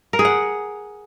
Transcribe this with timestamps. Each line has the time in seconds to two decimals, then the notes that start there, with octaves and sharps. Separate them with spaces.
0.13 A#4
0.19 G#4
0.25 F#5